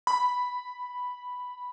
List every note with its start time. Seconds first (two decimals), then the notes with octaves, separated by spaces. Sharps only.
0.07 B5